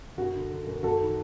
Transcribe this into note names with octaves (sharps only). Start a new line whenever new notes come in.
F#2 F#4
D3
D3
F#2
F#2 F#4 A4
D#3